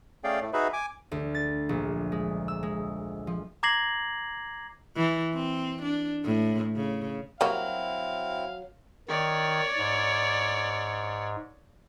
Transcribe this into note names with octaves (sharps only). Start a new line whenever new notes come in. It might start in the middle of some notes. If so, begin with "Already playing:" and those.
A3 C#4 G#4 D5 F5 G5
A2 A3
D#4 F#4 G#4 B4 E5 B5
G#5 D6
D2
A6
A#1
G#3
E6
G#3
F3
A#5 D6 G#6 A#6 C7 F#7
E3
C4
D4
A2
C#3
F#3 G3 A#3 C4 E4 F#4 F5
D#3 C#5 D5
G#2